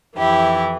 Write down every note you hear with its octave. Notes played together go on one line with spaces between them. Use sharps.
F2 E3 E4 G4